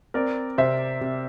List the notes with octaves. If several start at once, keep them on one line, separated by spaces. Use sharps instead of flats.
C4 A#4 D5
C3 C5 E5
C3